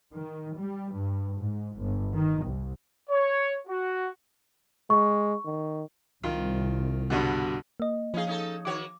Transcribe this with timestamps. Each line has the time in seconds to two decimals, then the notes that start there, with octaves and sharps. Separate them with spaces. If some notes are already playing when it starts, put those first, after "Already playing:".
0.13 D#3
0.56 G3
0.94 G2
1.37 G#2
1.78 G1
2.14 D#3
2.44 C2
3.10 C#5
3.67 F#4
4.90 G#3 C#6
5.46 D#3
6.23 C2 D#3 F4
7.10 G2 B2 D3
7.80 A#3 D#5
8.14 F3 C#4 D#4 G#4 F5
8.27 C#4 D#4 A4
8.65 D#3 F#4 C#5 D6